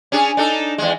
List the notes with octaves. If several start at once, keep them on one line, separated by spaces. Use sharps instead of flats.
C#4 D4 G#4
D4 D#4 A4
E2 G#3